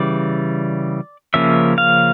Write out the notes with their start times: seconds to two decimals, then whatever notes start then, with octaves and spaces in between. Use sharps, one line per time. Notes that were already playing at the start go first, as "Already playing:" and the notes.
Already playing: C#3 E3 G3 D5
1.34 C#3 F3 A#3 C#4 E5
1.78 F5